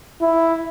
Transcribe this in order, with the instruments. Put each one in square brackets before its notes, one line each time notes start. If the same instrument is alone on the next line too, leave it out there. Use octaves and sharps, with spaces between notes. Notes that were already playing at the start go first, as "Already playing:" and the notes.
[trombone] E4